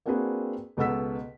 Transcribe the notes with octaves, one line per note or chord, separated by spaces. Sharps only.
A#3 C4 D4 F#4 G#4 B4
C#2 B2 A4 F#5 E6 B6